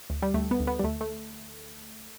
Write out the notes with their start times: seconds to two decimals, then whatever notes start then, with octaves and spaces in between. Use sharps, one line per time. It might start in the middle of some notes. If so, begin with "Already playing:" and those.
0.10 D2
0.22 G3
0.34 D2 A3
0.51 B3
0.60 D2
0.67 B3
0.79 G3
0.84 D2 A3
1.01 A3